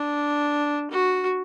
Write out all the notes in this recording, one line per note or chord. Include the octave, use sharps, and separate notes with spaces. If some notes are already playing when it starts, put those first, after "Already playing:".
Already playing: D4
F#4